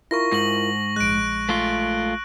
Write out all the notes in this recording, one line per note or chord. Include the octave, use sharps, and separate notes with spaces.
E4 F4 A#4 C#6 A#6
G#2 A#6 F#7
A#1 G#3 F#6 D7
A3 F4